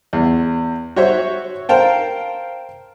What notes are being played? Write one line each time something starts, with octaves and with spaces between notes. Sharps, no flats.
E2
F#4 C5 C#5 E5 C#6
A#4 C5 F5 G5 A5